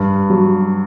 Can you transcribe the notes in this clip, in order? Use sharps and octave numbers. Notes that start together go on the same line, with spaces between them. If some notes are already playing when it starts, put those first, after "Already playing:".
Already playing: G2
F#3